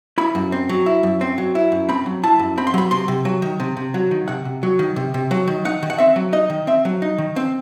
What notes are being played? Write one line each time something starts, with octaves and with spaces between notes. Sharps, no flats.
E4 B5
F#2
C4
F#3
E4
F#2
C4
F#3
E4
F#2
C4 B5
F#3
E4 A5
F#2
C4 B5
C6
F#3 B5
C3 C6
C3
F#3
D#3
C3
C3
F#3
D#3
C3 F#5
C3
F#3
D#3
C3
C3
F#3
D#3
D#4 F#5
D#3
F#5
C4 E5
F#3
D#4 D#5
D#3
C4 E5
F#3
D#4
D#3
C4